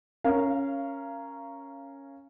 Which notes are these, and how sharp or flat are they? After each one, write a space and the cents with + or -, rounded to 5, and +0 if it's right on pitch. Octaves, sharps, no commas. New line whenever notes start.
C#4 +0 A#4 +0 F5 -25